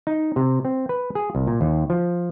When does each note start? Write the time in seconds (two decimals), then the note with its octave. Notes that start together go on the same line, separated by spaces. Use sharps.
0.07 D#4
0.36 C3
0.65 C4
0.89 B4
1.15 G#4
1.35 C2
1.47 A#2
1.61 D#2
1.90 F3